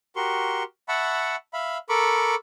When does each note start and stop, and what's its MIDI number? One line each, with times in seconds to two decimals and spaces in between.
0.16 0.63 66
0.16 0.63 67
0.16 0.63 70
0.16 0.63 84
0.16 0.63 85
0.88 1.36 76
0.88 1.36 78
0.88 1.36 81
0.88 1.36 83
0.88 1.36 85
1.53 1.78 76
1.53 1.78 77
1.53 1.78 83
1.89 2.35 69
1.89 2.35 70
1.89 2.35 83
1.89 2.35 85
1.89 2.35 86